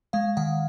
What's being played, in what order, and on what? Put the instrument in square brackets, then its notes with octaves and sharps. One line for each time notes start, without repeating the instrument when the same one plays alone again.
[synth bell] G#3 F5
D#3 F#5